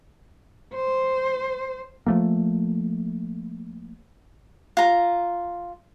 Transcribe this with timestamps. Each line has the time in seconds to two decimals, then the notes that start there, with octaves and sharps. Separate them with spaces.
0.75 C5
2.06 F3 A3 A#3
4.77 F4 A#5